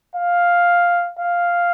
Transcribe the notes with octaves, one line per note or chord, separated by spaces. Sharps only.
F5
F5